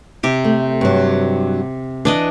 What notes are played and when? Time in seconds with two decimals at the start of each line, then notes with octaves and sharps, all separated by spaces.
0.23 C3 G4
0.45 A3
0.81 G2 F#3
2.05 E3 D4 D5 D#5